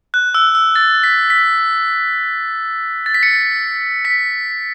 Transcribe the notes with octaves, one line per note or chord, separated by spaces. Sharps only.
F#6
E6
E6
A6
B6
B6
A6
B6
C#7
B6